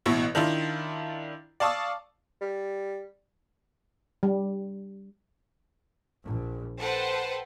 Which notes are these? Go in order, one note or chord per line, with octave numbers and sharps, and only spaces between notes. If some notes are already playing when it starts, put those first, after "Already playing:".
A1 B2 E4 C#6
D#3 D4 E4 F4
D5 F5 A5 C#6 D#6 E6
G3
G3
A#1
A4 B4 C5 F#5 G5